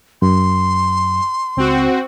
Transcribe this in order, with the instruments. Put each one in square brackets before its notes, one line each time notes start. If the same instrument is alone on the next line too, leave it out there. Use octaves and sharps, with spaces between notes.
[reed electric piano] F#2 [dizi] C6
[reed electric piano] C#2 [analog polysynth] C4 F#4